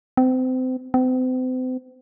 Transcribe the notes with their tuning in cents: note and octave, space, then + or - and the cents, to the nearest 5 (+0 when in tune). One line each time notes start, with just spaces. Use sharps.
C4 -30
C4 -40